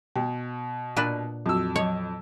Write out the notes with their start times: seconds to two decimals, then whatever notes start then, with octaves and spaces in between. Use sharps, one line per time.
0.16 B2 G5
0.97 A#2 D4 B4
1.46 F2 F#3 F#4 E6
1.76 F#3 C#5 D#5